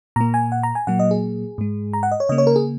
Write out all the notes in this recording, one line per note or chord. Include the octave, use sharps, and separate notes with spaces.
A#2 A#3 A#5
G#5
F#5
A#5
G#5
A#2 F#3 A#3 F#5
D#5
G#4
G#2 G#3
A#5
F#5
D#5
C#5
C#3 A#3 D#5
C#5
A#4
G#4